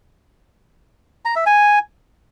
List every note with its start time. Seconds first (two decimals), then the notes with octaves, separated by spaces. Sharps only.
1.25 A#5
1.36 E5
1.46 G#5